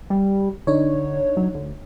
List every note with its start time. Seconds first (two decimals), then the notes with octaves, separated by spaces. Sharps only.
0.10 G3
0.67 D3 D4 D#4 C#5
1.37 F#3
1.55 D2